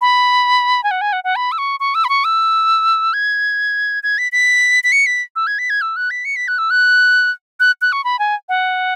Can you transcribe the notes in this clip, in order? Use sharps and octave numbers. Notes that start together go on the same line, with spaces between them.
B5
G#5
F#5
G#5
F#5
F#5
B5
E6
C#6
C#6
E6
B5
C#6
E6
G#6
G#6
B6
B6
B6
C#7
B6
E6
G#6
B6
G#6
E6
F#6
B6
C#7
B6
F#6
E6
F#6
F#6
F#6
C#6
B5
G#5
F#5